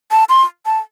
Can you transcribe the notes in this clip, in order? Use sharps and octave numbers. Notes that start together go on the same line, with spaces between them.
A5
C6
A5